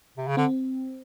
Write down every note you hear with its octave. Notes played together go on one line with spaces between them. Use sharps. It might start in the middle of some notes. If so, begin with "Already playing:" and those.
C3
C#3
D3 C4